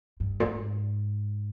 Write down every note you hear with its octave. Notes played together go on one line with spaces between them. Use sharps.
G2
A#2
G#2